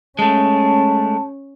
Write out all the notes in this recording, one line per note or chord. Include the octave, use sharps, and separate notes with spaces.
G#3 A3 C#4 A5